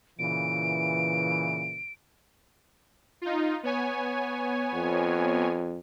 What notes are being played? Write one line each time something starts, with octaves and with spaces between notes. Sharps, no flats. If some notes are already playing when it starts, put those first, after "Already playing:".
A#2 C#3 E3 D7
D#4 F4
B3 C#5 G#5
F2